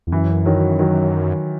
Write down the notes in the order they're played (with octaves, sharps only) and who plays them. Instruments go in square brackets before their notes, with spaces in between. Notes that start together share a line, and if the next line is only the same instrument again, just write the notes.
[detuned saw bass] E2
[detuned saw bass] F#2 [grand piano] E3
[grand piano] D#3 F#3
D#3 F#3